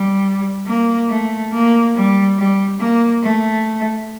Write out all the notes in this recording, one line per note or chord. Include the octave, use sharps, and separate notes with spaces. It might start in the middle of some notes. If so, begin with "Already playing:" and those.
Already playing: G3
A#3
A3
A#3
G3
G3
A#3
A3